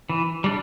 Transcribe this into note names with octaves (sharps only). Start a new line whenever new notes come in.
E3
G3 D4